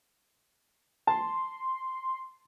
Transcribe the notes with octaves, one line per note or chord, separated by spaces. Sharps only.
A5 C6